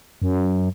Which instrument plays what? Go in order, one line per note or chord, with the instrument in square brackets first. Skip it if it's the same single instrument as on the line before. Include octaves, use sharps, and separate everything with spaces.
[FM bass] F#2